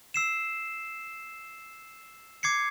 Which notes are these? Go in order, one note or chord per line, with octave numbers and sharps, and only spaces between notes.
E6 C7 E7
D6 G#6 C7 C#7